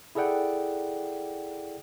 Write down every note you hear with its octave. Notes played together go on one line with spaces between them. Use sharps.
E4 G#4 A4 D5 F#5 G5